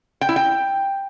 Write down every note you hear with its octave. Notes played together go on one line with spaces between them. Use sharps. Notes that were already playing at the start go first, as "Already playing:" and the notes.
G5
E4
G5